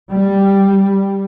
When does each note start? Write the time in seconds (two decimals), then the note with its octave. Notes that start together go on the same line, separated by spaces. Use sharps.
0.11 G3